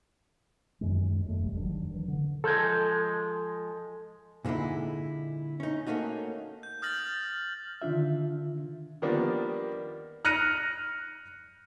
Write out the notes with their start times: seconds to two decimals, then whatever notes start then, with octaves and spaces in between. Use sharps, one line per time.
0.81 F#2 D#3 G3 G#3
1.26 F#2 G#3 A3
1.40 E1 A1 F3 G3
1.58 D#3 F#3 D4
1.94 E3
2.08 D3
2.44 F3 G#3 A4
4.45 A#2 D3 G#3 D#4 E4
5.60 C#4 D#4
5.86 A3 A#3 C#4 D#4 F#4
6.63 G6
6.82 D#6 F6 G6 A6 A#6 F#7
7.82 D3 D#3 D4 F4 E5
9.02 D#3 F3 G3 A#3 B3 D4
10.25 F6 F#6 A#6 C#7 D#7